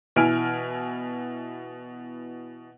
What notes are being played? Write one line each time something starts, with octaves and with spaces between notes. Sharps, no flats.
B2 E3 E4 G#5 F6 D7